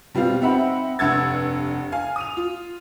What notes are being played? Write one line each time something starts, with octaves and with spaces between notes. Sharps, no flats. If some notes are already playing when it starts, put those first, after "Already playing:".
B2 G3 C4 F4 F5
C4 D#4 E5 F#5 B5
F1 G2 F#5 E6 G#6 A6
F5 G#5
D#6 D#7 F7
F4